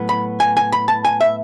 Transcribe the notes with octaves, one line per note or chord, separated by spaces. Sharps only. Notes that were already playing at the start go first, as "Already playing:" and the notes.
Already playing: A2 F#3 B3
B5
G#5
G#5
B5
A5
G#5
E5